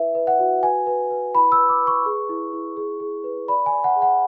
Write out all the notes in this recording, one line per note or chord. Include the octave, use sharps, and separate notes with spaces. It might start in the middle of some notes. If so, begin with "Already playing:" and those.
Already playing: E4 B4 E5
B4
F#5
F#4
B4 G#5
B4
B4
E4 B5
E6
B4
D6
B4
C#6
G#4
E4
E4
G#4
G#4
B4
D5 B5
G#5
D5
F#5
G#4
F#5